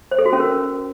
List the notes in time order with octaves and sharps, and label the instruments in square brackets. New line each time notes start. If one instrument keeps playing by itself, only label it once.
[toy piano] C5
A4
F#4
C#4
A#4